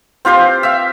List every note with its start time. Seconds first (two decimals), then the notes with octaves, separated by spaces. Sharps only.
0.25 C4 F4 G4 C5
0.63 E5 F5